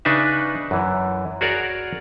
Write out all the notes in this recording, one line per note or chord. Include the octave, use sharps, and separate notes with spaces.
C#3 D4 D#4 B4 E5
F#2 E3
F#4 G#4 A#4 C#5 D5 F#5